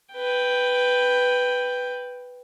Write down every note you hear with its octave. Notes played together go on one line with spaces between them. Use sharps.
B4 G5